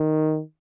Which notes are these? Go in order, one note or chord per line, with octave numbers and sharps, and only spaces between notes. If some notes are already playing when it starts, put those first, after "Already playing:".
Already playing: D#3